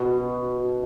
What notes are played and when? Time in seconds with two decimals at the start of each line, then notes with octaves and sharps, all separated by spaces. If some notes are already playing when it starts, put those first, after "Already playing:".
Already playing: B2 F#4
0.18 F#4
0.57 F#4